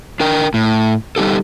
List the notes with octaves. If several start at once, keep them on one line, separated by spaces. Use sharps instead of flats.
D4 A#4 G5
A2
G3 D#4 G4 A4